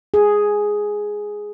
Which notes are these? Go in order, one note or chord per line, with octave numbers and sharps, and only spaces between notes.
G#4